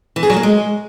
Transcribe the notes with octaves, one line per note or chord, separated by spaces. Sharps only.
E3
G#4
F#3
A#3
G#3